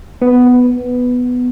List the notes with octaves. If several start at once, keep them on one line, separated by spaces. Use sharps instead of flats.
B3